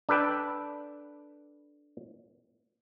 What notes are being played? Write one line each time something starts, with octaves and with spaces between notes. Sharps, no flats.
D4 A4 B4 G5